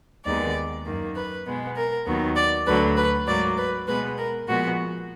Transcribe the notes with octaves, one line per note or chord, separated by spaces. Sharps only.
D#2 D#3 G#3 B3 D5
F#2 D#3 A#3
B4
B2 G#3 B3
A#4
D#2 D#3 F#3 B3
D5
D2 D3 F#3 B4
B4
G#2 F#3 A#3 D5
B4
B2 G#3 B3 B4
A#4
A#2 F3 G#3 B3 F#4